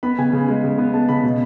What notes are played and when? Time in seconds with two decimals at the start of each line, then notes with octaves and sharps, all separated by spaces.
0.03 B3 B5
0.18 C#3 G#5
0.33 C#3
0.48 G#3
0.64 C#3
0.78 B3
0.94 G#3 A5
1.09 C#3 B5
1.23 B2